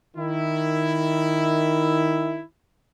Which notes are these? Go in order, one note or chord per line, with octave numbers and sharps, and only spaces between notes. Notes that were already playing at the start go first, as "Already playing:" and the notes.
D#3 E4